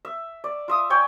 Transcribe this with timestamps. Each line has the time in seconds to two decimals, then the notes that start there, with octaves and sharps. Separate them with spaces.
0.05 E5
0.44 D5
0.68 F4 E5 D#6
0.90 C#5 D5 G5 G#5